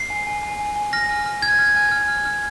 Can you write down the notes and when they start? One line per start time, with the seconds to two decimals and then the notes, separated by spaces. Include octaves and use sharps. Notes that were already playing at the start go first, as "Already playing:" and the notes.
Already playing: C7
0.10 G#5
0.27 G#5
0.43 G#5
0.60 G#5
0.76 G#5
0.93 F6 A#6
1.09 G#5
1.26 F6
1.42 F6 G#6
1.59 F6
1.76 G#5
1.92 F6
2.08 F6
2.25 F6